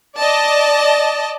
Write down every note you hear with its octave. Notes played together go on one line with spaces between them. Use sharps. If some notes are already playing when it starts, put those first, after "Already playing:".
D5 D#5 A5